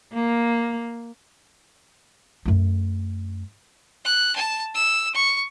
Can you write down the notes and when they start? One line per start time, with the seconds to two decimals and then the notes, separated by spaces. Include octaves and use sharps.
0.14 A#3
2.45 F#2 A3
4.05 F#6
4.36 A5
4.74 E6
5.14 C#6